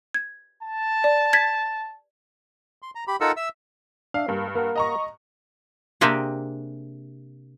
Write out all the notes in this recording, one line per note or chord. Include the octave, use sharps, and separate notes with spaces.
G#6
A5
D5
G#6 A6 B6
C6
A#5
G4 B5
D#4 F4 A4 A#4 F#5 E6
E5 E6
D4 E5 F5
G2 A#3
A#3 A#4 F#5
D#5 A#5 C#6
C3 A#3 C4 D4 G4 G#4